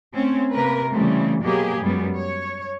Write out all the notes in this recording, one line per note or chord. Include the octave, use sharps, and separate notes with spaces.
A3 C4 C#4
C3 A#3 A#4 B4
C#3 E3 G3 A3 C4
B2 F#3 A#3 G4 G#4
F#2 G3 G#3 B3
C#5